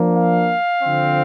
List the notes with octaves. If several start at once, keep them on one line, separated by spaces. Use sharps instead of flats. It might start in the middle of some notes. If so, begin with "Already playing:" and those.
Already playing: F3 A#3 D4
F5
D3 F3 C4